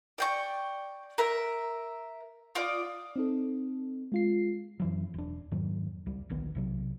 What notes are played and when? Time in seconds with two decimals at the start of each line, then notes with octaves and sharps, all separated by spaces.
0.18 D5 G5 C#6
1.18 A#4 E5
2.55 F4 D5 D#5
3.16 C4 D#4 A4
4.12 G#3 F4 C7
4.80 F#2 E3 F#3
5.14 E1 D4
5.52 F2 G#2 D#3 F#3
6.06 C#2 G3
6.30 D1 A#1 D#3 B3
6.55 B1 C3 F#3